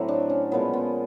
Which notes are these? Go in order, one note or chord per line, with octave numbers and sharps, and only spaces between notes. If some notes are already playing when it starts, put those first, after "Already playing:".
Already playing: A2 F#3 A3 C4
D4
C#4
A#2 F3 G#3 B3
B3